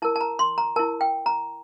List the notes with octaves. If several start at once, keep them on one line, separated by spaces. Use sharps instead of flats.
E4 A#4 A5
A5
A#5
C6
A#5
E4 A#4 A5
G5
A#5